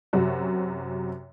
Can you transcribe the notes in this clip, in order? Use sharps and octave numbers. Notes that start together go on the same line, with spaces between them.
F#2 C3 F#4